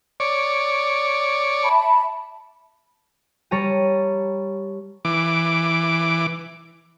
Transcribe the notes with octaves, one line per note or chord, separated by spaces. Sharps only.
C#5 D5
E5 A5 B5
G3 C#5 A5 A#5 D#7
E3 D6